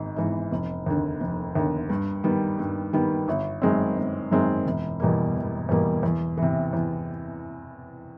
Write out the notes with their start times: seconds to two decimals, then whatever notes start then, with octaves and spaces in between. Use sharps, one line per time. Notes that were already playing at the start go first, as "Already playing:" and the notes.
Already playing: G#1 G#2
0.16 G#2 E3
0.52 F1
0.86 D#2 D3
1.20 F1
1.55 D#2 D3
1.89 G2
2.24 D#3 G3 B3
2.59 G2
2.93 D#3 G3 B3
3.28 G1
3.62 F#2 D#3 G#3 C4
3.96 G1
4.31 F#2 D#3 G#3 C4
4.66 E1
5.00 E2 B2 G3 A#3
5.34 E1
5.69 E2 B2 G3 A#3
6.03 E2
6.37 C3 E3
6.73 E2